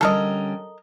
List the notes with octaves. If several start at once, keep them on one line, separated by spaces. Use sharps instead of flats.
D3 G3 C#4 A4 A#4 D#5